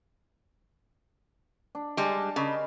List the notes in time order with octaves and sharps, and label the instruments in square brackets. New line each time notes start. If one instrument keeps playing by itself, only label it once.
[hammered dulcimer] D4
[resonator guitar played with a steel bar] G3 G#3 [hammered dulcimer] D4 G#5 C6
[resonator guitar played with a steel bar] C#3 [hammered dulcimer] A#4 D#5 B5